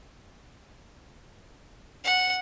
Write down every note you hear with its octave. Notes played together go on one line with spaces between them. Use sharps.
F#5